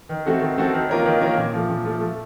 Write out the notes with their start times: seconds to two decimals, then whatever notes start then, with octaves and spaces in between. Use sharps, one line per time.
0.09 D#3
0.26 A3 C4 F#4 A4
0.41 D#3
0.58 A3 C4 F#4 A4
0.74 D#3
0.89 A#3 F4 A#4 C#5
1.06 D#3
1.21 A#3 F4 A#4 C#5
1.38 A#2
1.53 F3 A3
1.70 A#2
1.85 F3 A3
2.01 A3